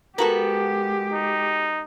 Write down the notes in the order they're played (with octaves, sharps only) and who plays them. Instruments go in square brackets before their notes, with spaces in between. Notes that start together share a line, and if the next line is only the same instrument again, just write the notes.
[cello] G#3 G4 [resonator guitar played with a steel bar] B3 F#4 A4 [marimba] A#4 A#5
[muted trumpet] D#4